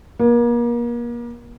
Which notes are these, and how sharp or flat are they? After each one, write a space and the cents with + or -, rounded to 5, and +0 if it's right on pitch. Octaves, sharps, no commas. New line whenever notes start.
A#3 +35